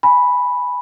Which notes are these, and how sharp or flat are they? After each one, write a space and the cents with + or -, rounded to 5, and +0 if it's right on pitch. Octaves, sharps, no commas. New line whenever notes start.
G#5 +0 B5 +0